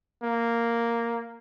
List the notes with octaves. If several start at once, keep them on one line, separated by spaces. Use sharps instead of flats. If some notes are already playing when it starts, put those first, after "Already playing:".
A#3